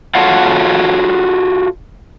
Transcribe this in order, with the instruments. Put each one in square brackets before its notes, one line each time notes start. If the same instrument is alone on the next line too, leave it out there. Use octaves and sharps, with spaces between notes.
[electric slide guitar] F4 F#4 A4 C#5 F5 F#5